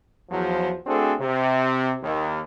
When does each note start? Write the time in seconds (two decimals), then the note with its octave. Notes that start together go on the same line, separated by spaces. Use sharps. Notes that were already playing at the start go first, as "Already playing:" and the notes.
0.30 E2 F3 F#3
0.87 A3 C4 D4 F#4 G#4 A4
1.20 C3
2.02 D#2